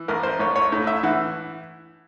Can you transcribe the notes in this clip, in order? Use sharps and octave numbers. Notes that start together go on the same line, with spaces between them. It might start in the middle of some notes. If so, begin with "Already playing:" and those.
Already playing: E3
A1 A#4
C5
A1 C#5
C#5
A2
E5
E3 F#5